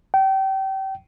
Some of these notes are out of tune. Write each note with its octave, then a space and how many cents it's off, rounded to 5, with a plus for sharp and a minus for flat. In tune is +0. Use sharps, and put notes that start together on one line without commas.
G5 -30